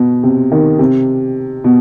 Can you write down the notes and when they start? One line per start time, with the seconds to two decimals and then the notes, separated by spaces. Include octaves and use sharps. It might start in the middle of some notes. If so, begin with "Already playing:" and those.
Already playing: B2
0.23 C3
0.52 D#3
0.79 C3
1.64 B2